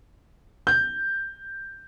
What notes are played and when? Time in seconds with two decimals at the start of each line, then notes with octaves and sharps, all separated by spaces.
0.67 G6